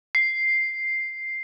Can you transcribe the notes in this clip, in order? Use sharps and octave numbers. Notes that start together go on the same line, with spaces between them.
C7